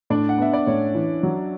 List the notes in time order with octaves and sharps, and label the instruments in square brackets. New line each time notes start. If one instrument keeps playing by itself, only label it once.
[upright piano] A2 [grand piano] D4 D5
[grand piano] F#5
[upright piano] B3 [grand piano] E5
[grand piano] D5
[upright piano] A2 [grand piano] C#4 C#5
[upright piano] E3
F#3